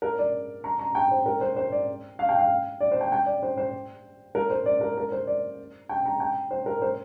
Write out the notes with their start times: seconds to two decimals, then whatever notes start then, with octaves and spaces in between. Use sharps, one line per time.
0.02 A#4
0.19 D5
0.64 A#5
0.79 A#5
0.95 G5
1.11 C5
1.26 A#4
1.41 C5
1.56 C5
1.72 D5
2.19 F5
2.29 G5
2.39 F5
2.80 D5
2.91 C5
3.01 G5
3.12 G5
3.26 D5
3.43 C5
3.57 C5
4.35 A#4
4.50 C5
4.66 D5
4.81 A#4
4.97 A#4
5.12 C5
5.27 D5
5.89 G5
6.05 A#5
6.20 G5
6.51 C5
6.66 A#4
6.82 C5